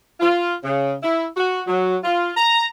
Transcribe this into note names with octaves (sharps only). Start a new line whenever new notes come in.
F4
C#3
E4
F#4
F#3
F4
A#5